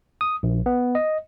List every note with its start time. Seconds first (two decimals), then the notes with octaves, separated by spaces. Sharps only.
0.21 D#6
0.43 A#1
0.66 B3
0.95 D#5